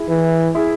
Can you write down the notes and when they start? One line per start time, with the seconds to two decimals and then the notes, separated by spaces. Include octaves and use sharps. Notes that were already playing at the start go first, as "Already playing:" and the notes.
Already playing: E4 G#4
0.09 E3
0.55 E4 G#4